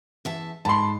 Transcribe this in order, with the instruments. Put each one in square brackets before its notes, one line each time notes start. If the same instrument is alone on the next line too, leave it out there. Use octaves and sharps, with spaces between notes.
[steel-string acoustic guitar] E2 E5 A5
[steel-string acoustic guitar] G#2 [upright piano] A5 B5 C6